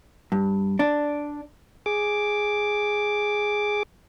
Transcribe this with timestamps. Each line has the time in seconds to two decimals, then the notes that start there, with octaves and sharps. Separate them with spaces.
0.32 G2
0.79 D4
1.86 G#4 D6